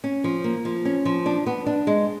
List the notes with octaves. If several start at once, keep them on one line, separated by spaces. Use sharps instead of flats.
C#4
F3
A#3
F3
C#4
F3
D4
B3
D4
G#3